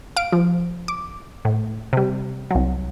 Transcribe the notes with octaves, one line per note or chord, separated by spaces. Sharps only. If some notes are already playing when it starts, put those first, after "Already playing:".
F5 D7
F3
D6
A2
C3 G3
C2 F#3